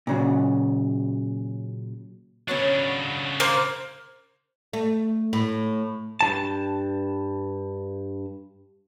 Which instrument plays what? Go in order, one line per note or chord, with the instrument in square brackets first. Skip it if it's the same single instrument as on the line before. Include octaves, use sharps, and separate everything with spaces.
[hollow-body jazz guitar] A#2 C#3 F#3
[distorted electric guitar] C#3 D4 [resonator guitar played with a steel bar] F#3 B3 C#4
[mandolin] A#3 [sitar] C5
[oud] A3
A2
[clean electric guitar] G2 E3 A5